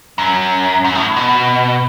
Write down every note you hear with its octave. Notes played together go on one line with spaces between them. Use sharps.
F#2
F#2
A2
B2